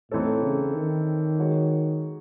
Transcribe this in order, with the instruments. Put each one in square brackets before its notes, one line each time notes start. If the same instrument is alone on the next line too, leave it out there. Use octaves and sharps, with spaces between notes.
[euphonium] A2 [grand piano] E3 C4 D#4 A4 C#5
[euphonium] C#3
D#3
[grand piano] G#3 D#4 F#4 C#5